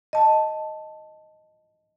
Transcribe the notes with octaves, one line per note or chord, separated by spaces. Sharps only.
D#5 A5